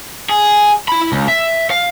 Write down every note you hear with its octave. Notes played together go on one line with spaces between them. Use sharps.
G#4
E4 B5
C#2
E5
F5